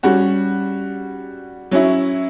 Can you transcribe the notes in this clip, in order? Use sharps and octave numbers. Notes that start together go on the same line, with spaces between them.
G3 C#4 F#4
F#3 C#4 E4